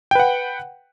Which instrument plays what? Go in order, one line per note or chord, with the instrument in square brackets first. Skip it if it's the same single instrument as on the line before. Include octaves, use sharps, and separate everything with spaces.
[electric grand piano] G5
B4
F#5